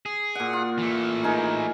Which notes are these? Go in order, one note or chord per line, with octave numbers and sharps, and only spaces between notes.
G#4
A#2 F#5
F4
E3 A3
D#4 G#4 A#4